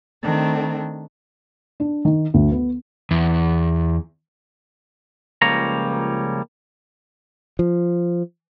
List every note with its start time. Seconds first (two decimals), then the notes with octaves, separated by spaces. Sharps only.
0.23 D#3 A3 C4 D4
1.80 D4
2.05 D#3
2.34 D2
2.52 B3
3.11 E2
5.42 C#2 F3 G3 A#3 C#5 A#5
7.59 F3